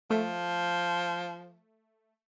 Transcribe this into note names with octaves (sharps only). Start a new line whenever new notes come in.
F3 A3